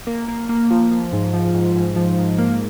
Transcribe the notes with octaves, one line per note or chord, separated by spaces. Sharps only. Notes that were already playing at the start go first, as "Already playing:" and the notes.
A#3
A#3
A#3
F3
F3
G#2
F3
G#2
G#2
F3
G#2
A#3